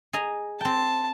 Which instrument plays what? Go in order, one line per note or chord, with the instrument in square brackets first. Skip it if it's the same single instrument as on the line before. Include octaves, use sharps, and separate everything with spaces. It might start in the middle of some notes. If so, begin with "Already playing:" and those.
[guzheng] G#4 D#5 A#5
[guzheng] C4 G5 [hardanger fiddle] A5